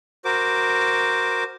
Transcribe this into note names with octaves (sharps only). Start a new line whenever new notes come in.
F#4 A#4 C5 D6